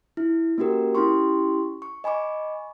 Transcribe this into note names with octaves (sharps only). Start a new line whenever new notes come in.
E4
A#3 C#4 F#4 G4 A#4
C#4 E4 G4 C6 C#6
C#6
D#5 G#5 B5 C#6 D6